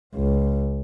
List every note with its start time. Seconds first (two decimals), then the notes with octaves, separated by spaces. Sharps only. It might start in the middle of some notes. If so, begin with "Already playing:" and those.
0.15 C#2